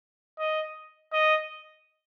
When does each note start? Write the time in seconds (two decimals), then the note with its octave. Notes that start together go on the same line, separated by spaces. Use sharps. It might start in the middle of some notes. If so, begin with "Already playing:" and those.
0.39 D#5
1.13 D#5